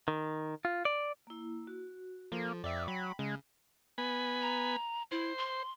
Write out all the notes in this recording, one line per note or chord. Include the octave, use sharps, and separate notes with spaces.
D#3
F4
D5
A#3 E4
F#4
F3 A#3 A4
F2 D5 E5 G5
F#3 B5
C#3 G#3
B3 G#5 B5
A#5
E4 C5
C6